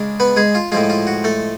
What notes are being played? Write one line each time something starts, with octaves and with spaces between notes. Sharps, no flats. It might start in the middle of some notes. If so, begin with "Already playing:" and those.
Already playing: C#3 G#3 D4
B3 B4
G#3 G#4
F4
A2 F3 G#3 F4
F4
F#4
A3 A4